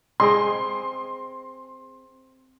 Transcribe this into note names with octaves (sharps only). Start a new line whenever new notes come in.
C4 G#4 D#5 C6